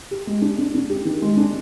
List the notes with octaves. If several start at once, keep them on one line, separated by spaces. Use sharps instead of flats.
G4
G#3
D4
D4
D4
G4
D#3
G#3
D4